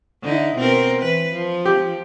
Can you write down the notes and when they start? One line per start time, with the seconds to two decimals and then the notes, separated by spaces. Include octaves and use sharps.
0.23 D3 D#4 E4
0.56 B2 C4 A#4
1.00 E3 B4
1.33 F3
1.65 G4